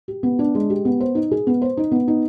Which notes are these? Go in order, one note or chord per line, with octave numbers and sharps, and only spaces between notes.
G4
B3
D4
G#3
G4
B3
C5
D#4
G#4
B3
C5
D#4
B3
D#4